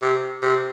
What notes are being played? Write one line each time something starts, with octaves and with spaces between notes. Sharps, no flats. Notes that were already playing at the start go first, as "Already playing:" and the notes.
C3
C3